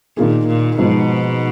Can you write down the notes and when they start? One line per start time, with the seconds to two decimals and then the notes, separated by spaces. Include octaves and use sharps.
0.17 A#2 D#3 A#3 F4 G#4
0.47 A#2
0.77 G#2 B2 F3 B3